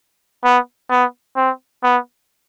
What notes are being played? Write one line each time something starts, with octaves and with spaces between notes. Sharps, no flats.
B3
B3
C4
B3